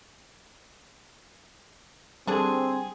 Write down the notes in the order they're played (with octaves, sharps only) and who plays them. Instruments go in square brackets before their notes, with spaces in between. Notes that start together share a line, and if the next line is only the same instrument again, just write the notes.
[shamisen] D3 D4 [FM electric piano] G3 [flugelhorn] C4 [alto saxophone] G#4